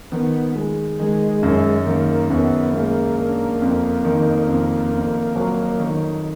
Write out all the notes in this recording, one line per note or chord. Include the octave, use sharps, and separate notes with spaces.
D#3 B3
G#3
D#3 G#3
F#2
D#3 A#3
F#2 B3
G#3 A#3
D4
F2
D#3
F2
F2
F#3
D#3